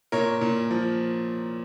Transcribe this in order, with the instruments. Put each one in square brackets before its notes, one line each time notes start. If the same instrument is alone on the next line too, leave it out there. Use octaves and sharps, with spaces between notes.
[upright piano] A#2 A#4 C#5
A#2
F3